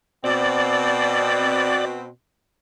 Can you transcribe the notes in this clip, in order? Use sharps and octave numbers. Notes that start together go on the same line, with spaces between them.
B2 C4 D5